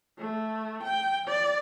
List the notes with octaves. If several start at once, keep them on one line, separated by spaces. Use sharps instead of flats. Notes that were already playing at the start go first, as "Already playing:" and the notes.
A3
G5
D5